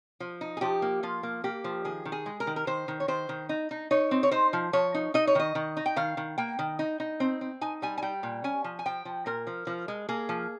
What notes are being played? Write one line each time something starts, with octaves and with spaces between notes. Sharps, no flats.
F3
D#4
G#4
F3 G4
A#3
F3 F4
A#3
A#3 G4
F3
D#3 G#4
D#3
G#4
G#3
A#4
D#3
A#4
D#3 C5
D#3
C#5
D#3 C5
D#3
D#4
D#4
D#4 C#5
C4
C#5
D#4 C5
F3
F3 C#5
D#4
D#4 D#5
C#5
D#3 D#5
D#3
D#4
G5
D#3 F5
D#3
A#3 G5
D#3
D#4
D#4
C4
C4
D#4 G#5
G3 G#5
G#5
G3 G5
A#2
C#4 G#5
F3
G#5
F3 G5
F3
A#2 A#4
F3
F3
G#3
A#3 G#4
F3